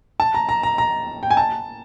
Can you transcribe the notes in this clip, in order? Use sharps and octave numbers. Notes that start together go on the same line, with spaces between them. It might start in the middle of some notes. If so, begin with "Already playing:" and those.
A5
A#5
A#5
A#5
A#5
G5
G#5
A5